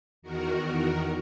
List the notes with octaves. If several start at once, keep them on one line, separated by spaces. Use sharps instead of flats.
E2 D#3 F#4 A#4